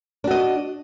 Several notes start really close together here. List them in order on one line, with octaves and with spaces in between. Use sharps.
D4 F#4 D#5